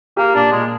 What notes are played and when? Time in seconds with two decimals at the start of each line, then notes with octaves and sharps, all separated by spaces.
0.17 A#3 G4
0.35 A#2 D4
0.52 A#2 G#3